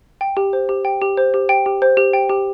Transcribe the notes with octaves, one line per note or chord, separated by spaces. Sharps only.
G5
G4
C5
G4
G5
G4
C5
G4
G5
G4
C5
G4
G5
G4